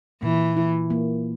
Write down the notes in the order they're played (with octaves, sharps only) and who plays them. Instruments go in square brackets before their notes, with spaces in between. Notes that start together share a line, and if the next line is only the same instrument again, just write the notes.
[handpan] A#2 [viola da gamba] E3
[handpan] E4
A#3